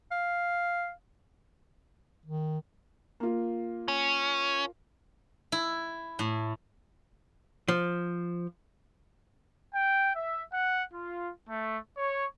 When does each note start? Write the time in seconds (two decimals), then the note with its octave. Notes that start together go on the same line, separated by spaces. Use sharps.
0.11 F5
2.26 D#3
3.20 A#3 F4
3.88 C#4
5.52 E4
6.19 A2
7.68 F3
9.74 G5
10.15 E5
10.50 F#5
10.93 F4
11.50 A3
11.96 C#5